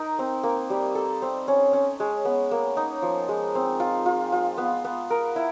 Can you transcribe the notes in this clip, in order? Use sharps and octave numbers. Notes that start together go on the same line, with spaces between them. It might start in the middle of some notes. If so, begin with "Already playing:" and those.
Already playing: D#4 A#4
C4
A#3
G3
A4
C4
C#4
C#4
G#3
B3
A#3
D#4
F3
G#3
C4
F4
F4
F4
B3
B3
A#4
E4